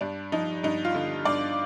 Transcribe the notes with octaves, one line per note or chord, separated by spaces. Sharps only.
G2 D4
F3 D#4
G2 D#4
F4
D3
G2 D5